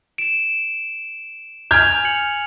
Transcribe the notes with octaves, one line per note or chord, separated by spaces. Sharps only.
D7 E7
G#5 F6 G6 G#6 F7
C#7 F#7